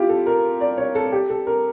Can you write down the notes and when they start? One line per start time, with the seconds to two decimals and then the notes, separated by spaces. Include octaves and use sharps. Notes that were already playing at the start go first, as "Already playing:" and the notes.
Already playing: E4 F4 G4
0.09 A4
0.26 A#4
0.61 D5
0.77 C#5
0.95 A4
1.12 G4
1.29 A4
1.47 A#4